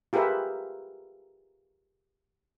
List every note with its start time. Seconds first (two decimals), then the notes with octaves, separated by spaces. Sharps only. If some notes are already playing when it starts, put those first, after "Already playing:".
0.13 F4 G4 G#4 A#4 B4 E5